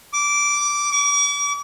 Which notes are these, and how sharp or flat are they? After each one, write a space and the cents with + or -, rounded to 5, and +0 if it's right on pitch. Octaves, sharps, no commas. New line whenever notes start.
D6 -10
D6 -45